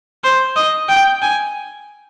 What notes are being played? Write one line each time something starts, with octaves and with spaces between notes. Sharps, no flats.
C5
D#5
G5
G#5